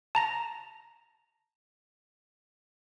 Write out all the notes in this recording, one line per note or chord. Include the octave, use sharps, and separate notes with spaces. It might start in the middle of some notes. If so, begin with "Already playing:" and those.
A5 A#5 A#6